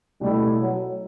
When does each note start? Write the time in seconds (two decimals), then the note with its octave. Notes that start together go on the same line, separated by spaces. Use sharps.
0.21 B2 G3 A3 E4
0.60 F#3